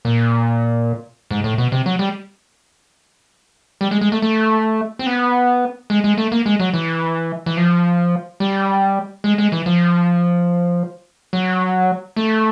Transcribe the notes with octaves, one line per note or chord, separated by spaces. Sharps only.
A#2
G#2
A2
B2
C3
F#3
G3
G3
G#3
G#3
A3
A3
C4
B3
G#3
G#3
A3
A#3
G#3
F#3
E3
E3
F3
G3
G#3
G#3
E3
F3
F#3
A3